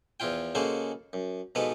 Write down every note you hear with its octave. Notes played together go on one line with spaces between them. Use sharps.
E2 F3 E4 F4 G5
C#3 G#3 A#3 F#4 A4 C5
F#2
G#2 B2 F3 G#3 A4 B4